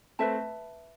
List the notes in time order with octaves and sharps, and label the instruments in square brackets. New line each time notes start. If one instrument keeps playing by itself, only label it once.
[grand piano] A3 C4 [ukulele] B4 E5 A5